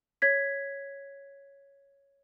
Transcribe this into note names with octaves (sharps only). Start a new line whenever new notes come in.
C#5 G#6 B6